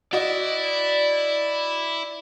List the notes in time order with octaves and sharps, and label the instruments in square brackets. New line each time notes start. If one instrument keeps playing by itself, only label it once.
[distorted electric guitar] E4 [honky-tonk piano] F#4 D#5 [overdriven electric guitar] D5